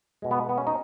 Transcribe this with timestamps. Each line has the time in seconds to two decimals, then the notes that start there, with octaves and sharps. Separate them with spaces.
0.22 B2 G#3
0.31 B3
0.49 B3
0.58 C#4
0.67 D#4